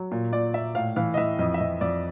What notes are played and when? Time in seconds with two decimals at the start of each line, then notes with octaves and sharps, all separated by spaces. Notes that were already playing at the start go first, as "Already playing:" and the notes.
Already playing: F#3
0.11 A#2
0.32 A#2 D5
0.54 A#2 E5
0.75 A2 F5
0.96 E3 F5
1.14 D#5
1.17 E3 E5
1.39 F2 D#5
1.54 E5
1.60 F2 D#5
1.81 F2 D5